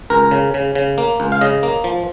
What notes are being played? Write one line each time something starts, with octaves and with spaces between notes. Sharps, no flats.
C#2 A#4
C#3
C#3
C#3
A#3
C#2
F5
C#3 D#5
A#3
F3